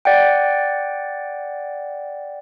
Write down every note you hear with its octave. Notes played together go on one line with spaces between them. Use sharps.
D5 F#5 G5